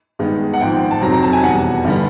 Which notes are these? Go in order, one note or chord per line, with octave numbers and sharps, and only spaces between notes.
G2 D#3 G#3 B3
F#5
G#1 G#2 F3 G5
G5
A5
F2 C3 D#3 F#3 A#5
A#5
A5
G#5
E2 B2 G3 F#5
G2 D3 G3 B3